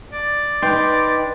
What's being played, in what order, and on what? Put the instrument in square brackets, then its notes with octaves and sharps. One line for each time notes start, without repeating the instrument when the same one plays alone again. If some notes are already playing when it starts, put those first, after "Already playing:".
[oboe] D5
[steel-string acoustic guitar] D#4 [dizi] B4 [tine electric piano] G5 C6